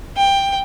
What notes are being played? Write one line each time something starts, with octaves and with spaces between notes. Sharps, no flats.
G5